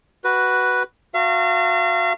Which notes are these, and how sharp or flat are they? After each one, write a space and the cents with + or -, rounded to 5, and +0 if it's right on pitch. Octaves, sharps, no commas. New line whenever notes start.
F#4 +10 B4 +0
F#4 -20 F5 -40 A#5 -45